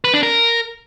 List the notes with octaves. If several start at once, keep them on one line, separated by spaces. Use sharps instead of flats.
B4
D4
A#4